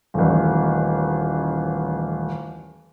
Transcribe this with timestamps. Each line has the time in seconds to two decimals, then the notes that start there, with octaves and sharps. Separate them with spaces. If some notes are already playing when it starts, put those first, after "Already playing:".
0.14 D#1 A1